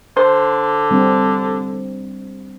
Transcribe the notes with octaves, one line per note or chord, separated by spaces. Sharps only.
D3 C5
G3 C4 D4